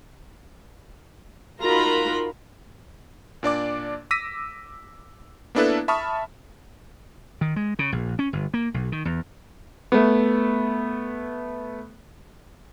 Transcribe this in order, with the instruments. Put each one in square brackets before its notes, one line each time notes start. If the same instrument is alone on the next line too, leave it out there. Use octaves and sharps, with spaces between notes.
[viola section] D#4 F4 F#4 A#4 A#5 B5
[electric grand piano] A#2 D4 D5 D6
D6 E6 A#6 B6 D#7
A#3 B3 D4 E4 A4 B4
E5 A5 B5 C#6 D#6 F6
[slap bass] D#3
G#3
C#3
A#1
C#4
G1
A#3
B1
D#3
E2
[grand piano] A3 B3